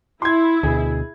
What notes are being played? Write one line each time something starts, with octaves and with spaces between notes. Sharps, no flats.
E4 C6 G#6
D2 B2 G#4